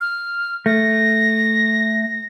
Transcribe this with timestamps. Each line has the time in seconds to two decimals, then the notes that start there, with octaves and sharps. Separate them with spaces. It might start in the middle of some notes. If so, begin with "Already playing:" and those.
0.01 F6
0.66 A3 A#6